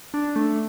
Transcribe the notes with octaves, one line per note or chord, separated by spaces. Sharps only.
D4
A3